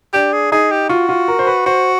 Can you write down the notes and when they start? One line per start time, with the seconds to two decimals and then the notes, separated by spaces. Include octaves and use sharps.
0.13 D4 G4
0.33 G#4
0.52 D#4 G#4
0.71 G4
0.89 F4 F#4
1.09 F4
1.28 A#4
1.39 C5
1.47 B4
1.66 F#4 C5